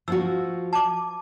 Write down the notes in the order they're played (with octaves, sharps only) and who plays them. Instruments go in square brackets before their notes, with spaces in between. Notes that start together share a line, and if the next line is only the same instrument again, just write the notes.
[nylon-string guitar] F3 F4 F#4 [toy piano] E6
[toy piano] A5 D6